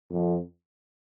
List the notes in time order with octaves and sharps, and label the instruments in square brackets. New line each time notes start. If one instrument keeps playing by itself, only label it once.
[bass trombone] F2